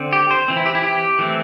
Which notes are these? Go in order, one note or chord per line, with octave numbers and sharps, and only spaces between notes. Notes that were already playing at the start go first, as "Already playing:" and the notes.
Already playing: D3 C4
G4
C5
E3 C4
E4
G4
E4
G4
E3 A3 C4